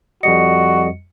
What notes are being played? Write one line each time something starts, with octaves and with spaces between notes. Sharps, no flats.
F2 G3 F#4 D#5 C#7